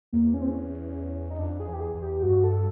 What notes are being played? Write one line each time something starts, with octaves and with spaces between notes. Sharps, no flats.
E2 A#3
C#4
C4
C#4
D#4
F2 D4
G#4
E2
G4
G#4
E2
G4
G2 F#4
A4